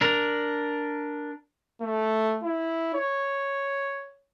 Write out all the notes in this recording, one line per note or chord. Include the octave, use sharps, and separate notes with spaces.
D4 A#4
A3
E4
C#5